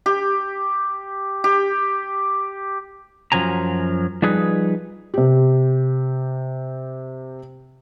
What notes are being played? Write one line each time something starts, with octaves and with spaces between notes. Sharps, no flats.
G4
G4
F#2 F3 F#3 G#5 A#5
F3 G3 D#4 G#4 B4
C3 G4